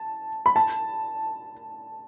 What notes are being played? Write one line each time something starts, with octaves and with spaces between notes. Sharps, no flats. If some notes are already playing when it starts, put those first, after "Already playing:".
Already playing: A5
B5
A5